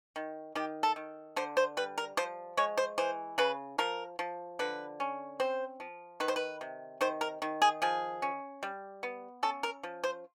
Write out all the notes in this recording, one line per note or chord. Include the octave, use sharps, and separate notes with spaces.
D#3
D#3 G4
A4
D#3
D3 C5
C5
G3 B4
A#4
F3 C5
G#3 C#5
C5
E3 C5
C#3 B4
F3 A#4
F3
D3 B4
C#4
C4 C5
F3
D#3 B4
C5
B4
C3
D#3 C5
A#4
D#3
G#4
F3 G#4
C#4
G3
B3
C#4 A4
A#4
F3
C5